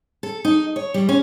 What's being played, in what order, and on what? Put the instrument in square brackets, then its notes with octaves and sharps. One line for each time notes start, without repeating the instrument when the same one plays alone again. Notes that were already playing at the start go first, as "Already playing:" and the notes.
[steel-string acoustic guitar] A4
D#4
C#5
G3
C#4